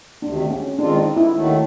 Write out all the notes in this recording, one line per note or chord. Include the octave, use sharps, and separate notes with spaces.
D2 C3 D#3 D4
C#4
D#3 G#3 C4 D4 F4
D#4
E4
D#2 D#3 F#3 A3